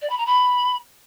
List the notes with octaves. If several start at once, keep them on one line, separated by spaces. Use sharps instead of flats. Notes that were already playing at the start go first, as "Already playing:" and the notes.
D5
B5
A#5
B5